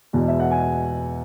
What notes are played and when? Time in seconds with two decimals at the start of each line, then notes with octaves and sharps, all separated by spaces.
0.13 E2 B2 G#3
0.28 E5
0.40 F#5
0.51 G#5